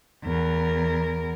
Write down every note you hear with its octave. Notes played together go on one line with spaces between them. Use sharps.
E2 A#4